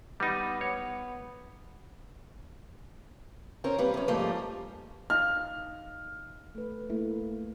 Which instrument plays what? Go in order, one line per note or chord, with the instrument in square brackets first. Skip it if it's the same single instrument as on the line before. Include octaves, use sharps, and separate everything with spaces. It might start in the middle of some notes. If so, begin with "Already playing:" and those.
[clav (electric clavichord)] G3 D#4 [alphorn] B3
[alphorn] B3 [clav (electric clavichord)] C#5
[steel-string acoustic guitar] C4 C#4 A#4
G3 A#3 B4
F#2 C#4
G#2 F3 G3 A3 A#3
[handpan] D#4 D#5 F5 [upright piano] F6
[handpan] A3 B4
A3 A#3 E4